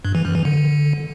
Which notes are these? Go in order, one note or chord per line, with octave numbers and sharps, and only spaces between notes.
G2
E3
F#2
E3
D3